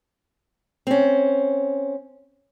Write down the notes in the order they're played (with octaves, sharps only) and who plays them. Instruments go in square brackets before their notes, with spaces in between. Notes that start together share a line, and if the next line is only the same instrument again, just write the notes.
[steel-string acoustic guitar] C4 C#4